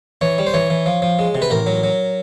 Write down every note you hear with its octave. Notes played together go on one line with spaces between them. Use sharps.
E3 C#5
G3
C5
E3 C#5
E3
F3
F3
G#3
C3
B4
A1 A#4
F#3
F#3